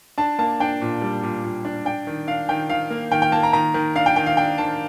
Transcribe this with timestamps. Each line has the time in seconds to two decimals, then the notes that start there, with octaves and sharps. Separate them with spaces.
0.18 D4 A5
0.39 A#3 A5
0.60 D4 G5
0.81 A#2
1.02 G3
1.23 A#2
1.44 A#2
1.65 D4
1.85 D4 G5
2.07 D#3
2.27 D4 F5
2.49 D#3 G5
2.69 D#3 F5
2.90 A#3
3.11 D#3 G5
3.22 G5
3.32 A#3 A5
3.43 A#5
3.53 D#3 A#5
3.74 D#3
3.95 D4 F5
4.06 G5
4.16 D#3 G5
4.26 F5
4.37 D4 G5
4.58 D#3 A5